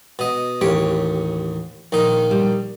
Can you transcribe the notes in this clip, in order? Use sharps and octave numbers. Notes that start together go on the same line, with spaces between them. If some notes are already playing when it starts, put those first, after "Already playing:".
B2 D#5
A1 D#2 G4 C#5
A#1 D#3 D#4
G3